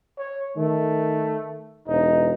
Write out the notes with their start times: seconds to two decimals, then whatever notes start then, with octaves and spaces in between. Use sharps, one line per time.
0.18 C#5
0.57 D#3 A3
1.87 E1 D#4